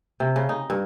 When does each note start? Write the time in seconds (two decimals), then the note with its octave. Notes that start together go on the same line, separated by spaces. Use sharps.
0.20 C3
0.36 C#3
0.49 D#4
0.70 G2